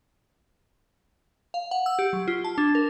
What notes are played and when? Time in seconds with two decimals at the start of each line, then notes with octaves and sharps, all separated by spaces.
1.54 F5
1.71 F#5
1.86 E6
1.99 G4
2.13 F#3
2.28 F4
2.44 A5
2.58 D4
2.75 A#4